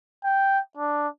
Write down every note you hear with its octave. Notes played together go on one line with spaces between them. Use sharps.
G5
D4